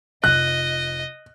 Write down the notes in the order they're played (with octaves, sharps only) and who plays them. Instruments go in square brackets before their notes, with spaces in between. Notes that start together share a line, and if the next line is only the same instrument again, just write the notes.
[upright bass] F1 F4 [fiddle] D#5 [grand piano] F#6